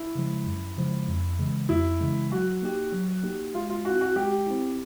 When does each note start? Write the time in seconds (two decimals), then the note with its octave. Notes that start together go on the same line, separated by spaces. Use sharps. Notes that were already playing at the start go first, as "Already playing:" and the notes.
Already playing: E4
0.15 C#3 F3 G#3
0.46 F#2
0.77 C#3 F3 G#3
1.08 F2
1.39 C#3 E3 G#3
1.69 F2 E4
2.01 C#3 E3 G#3
2.31 F#3 F#4
2.62 A#3 D#4 G4
2.92 F#3
3.23 A#3 D#4 G4
3.55 G#3 F4
3.70 F4
3.85 C4 E4 F#4
4.01 F#4
4.16 G#3 G4
4.47 C4 E4